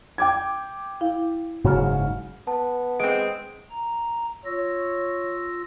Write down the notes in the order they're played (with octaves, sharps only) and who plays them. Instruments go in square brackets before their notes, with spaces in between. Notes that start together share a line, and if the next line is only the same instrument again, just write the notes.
[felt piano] G5 D6 G#6
[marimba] E4 F5
[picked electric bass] F#1 G#2 C#3 [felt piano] F#3 F#4 F6
[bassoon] B3 [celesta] A5
[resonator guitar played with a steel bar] G#3 C4 [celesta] D7
[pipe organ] A#5
[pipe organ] F4 E6 A#6 [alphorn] C#5